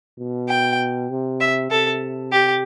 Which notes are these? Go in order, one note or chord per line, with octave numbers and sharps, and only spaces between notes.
B2
G5
C3
E5
C3 A4
G4